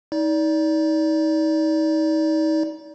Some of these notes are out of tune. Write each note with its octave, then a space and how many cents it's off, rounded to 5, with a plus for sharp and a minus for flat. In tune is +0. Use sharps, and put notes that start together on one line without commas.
D#4 +30 D5 -20